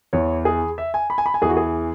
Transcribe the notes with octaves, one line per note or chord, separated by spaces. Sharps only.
E2 E3 C#5
G#4
E5
G#5
B5
G#5
B5
G#5
E2 E3 G#4
F#4
G#4